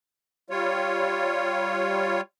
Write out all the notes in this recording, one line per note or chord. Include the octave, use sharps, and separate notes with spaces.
G3 F4 C#5